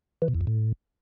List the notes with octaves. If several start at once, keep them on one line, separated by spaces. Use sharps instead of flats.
E3
B2
E2
F2
A2